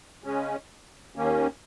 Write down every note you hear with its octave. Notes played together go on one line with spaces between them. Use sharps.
C#3 G#3 C#4
D#2 D#3 A#3 C#4